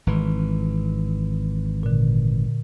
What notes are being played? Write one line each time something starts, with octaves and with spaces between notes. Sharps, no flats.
G#1 E3
A#2 D3